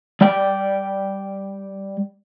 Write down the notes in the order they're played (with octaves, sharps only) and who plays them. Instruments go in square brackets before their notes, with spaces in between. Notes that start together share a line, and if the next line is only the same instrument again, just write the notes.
[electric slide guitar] G3 D5 G5